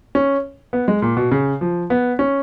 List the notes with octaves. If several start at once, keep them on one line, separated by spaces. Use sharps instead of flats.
C#4
B3
G#3
A#2
B2
C#3
F3
B3
C#4